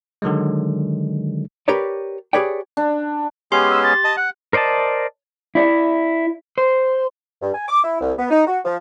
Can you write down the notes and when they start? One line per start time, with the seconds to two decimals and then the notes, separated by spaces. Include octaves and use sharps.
0.22 D3 D#3 F#3 G#3
1.68 G4 A#4 B4 C#5 D5
2.33 G4 G#4 B4 C#5 D5 G5
2.77 D4
3.52 G#3 B3 C#4 G4 C6
3.70 E6
3.82 A6
4.04 D#5 A5
4.17 F#5 F#6
4.53 A#4 C5 D5 D#5 A5
5.55 E4 D5 E5
6.58 C5
7.42 G2
7.54 G#5
7.68 D6
7.84 E4
8.01 C2
8.19 B3
8.30 D#4
8.47 F#4
8.65 F3